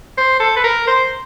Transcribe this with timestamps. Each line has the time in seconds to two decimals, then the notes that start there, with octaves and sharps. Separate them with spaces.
0.18 C5
0.40 A4
0.57 B4
0.64 A#4
0.87 C5